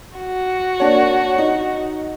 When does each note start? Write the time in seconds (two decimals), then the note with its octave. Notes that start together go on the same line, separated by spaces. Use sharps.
0.18 F#4
0.80 A#3 D4 C#5
1.38 D#4